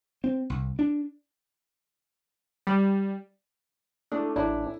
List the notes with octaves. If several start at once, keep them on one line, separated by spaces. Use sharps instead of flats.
C4
C2
D4
G3
A3 D4 E4 A4 E6
A1 D4 E4 C#5 A#5